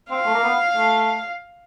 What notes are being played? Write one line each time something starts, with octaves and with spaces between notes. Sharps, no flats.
C4 F5
A3
A#3
B3
A3